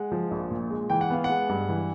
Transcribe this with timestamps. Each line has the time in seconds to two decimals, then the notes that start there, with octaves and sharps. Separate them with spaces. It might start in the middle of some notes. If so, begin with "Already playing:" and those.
Already playing: G#3 F#5
0.12 F3
0.31 A#1
0.51 A#2
0.70 G#3
0.90 E3 G5
1.01 F#5
1.10 B3 F5
1.24 F#5
1.30 G#3
1.49 G2
1.69 E3